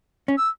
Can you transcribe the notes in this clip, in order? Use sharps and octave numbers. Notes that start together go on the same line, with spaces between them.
C#4
E6